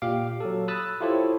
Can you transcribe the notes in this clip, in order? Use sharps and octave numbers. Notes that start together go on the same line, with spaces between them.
A#2 G4 F5 D6
F#3 A4
B5 D#6 E6 F#6 A6
E4 F4 G4 A4 C5 C#5